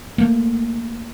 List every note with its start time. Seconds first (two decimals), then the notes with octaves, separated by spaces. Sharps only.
0.18 A3 A#3